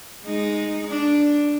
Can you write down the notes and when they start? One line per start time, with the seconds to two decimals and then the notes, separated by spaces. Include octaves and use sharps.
0.24 G#3 D#4
0.88 D4